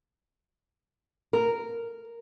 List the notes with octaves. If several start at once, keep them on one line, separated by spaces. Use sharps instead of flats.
A#4